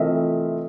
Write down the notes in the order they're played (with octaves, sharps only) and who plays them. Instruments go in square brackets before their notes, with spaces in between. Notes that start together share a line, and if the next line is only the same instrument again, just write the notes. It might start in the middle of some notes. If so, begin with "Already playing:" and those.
Already playing: [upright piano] E3 A3 C4 F4 A#4 [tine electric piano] D#5 E5